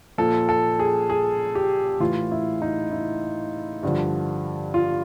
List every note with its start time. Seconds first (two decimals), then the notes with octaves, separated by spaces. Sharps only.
0.18 A#2 F3 A4
0.49 A4
0.79 G#4
1.10 G#4
1.55 G4
2.00 A2 E3 F4
2.31 E4
2.62 D#4
2.91 E4
3.83 G2 D3 F3
4.74 F4